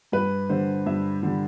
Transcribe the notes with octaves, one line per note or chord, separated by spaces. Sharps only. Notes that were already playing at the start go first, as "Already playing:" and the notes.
G2 B4
D3 G3 C5
G2 E5
D3 G3